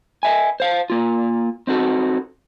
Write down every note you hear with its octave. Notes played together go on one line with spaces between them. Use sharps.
D#5 E5 G#5
C5 F5
A#3 F4
C4 D#4 F#4 A4